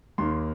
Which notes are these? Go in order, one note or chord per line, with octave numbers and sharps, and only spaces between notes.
D#2 D#3 A#3 D#4 C6